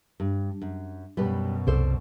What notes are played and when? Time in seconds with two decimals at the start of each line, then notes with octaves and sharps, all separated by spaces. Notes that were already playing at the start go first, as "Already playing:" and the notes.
0.20 G2
0.62 F#2
1.17 F#2 B2 G3 G4 B4
1.67 C2 A4 C5 D5